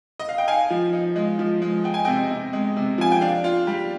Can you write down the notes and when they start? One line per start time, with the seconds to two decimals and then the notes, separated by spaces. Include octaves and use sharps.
0.20 D#5
0.29 F5
0.38 G5
0.48 D#4 F5 G#5
0.70 F3
0.93 D#4
1.16 G#3
1.39 F3
1.62 G#3
1.84 G#3 G5
1.94 G#5
2.05 C3 D#5 G5
2.31 C3
2.53 G#3
2.76 C3
2.98 F3 G#5
3.12 G5
3.21 D4 F5
3.44 F4
3.67 G3